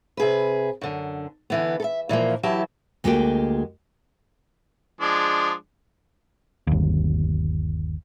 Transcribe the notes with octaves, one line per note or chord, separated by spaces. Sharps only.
C3 G#4 B4
F#2 D3
D3 E3 B3
A4 E5
A#2 E3 F3 A#3
E3 F#3 E4 G4 A5
D2 G#3 A#3 F#4 G4
F3 G#3 D4
G1 D#2